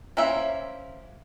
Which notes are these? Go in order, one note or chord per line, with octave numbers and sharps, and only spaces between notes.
A#3 C#4 E4 C5 E5